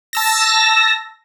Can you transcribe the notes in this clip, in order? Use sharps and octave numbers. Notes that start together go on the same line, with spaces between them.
A5 E6 A#6